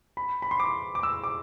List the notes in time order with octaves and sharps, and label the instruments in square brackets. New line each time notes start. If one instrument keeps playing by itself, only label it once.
[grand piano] B5
B5
C6
D6
D6
E6
D6